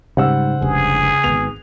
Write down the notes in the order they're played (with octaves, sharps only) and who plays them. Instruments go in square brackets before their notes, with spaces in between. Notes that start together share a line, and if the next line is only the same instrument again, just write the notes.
[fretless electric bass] G#2 G3 [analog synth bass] C#3 [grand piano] C5 F#5 E6
[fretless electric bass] F1 C#2 G2 [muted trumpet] G#4
[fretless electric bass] G#1 B3 [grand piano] F7